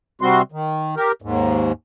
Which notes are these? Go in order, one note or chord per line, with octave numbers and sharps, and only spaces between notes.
C3 G3 C4 F#4 C6
D#3
G4 A#4
D#2 G#2